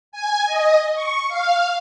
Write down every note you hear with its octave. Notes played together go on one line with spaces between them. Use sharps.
G#5
D#5
C#6
F5